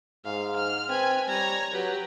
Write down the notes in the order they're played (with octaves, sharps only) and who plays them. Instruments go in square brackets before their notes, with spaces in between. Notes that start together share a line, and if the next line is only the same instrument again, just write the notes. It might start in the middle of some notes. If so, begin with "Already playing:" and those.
[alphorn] G#2 [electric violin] F5
[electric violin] F6
[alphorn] C4 [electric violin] B4 G#5
[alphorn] G3 [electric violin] C#5 A#5
[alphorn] F#3 [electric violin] G4 B4